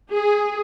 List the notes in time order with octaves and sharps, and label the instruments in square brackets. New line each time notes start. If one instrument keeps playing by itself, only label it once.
[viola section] G#4